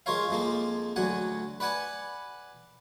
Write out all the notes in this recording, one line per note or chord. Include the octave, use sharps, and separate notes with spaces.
G#3 F4 A#4 C#5 F5
F2 F3 G#3 A#3
D2 F#3 F#5 G#5
B4 D5 F#5 G#5 A5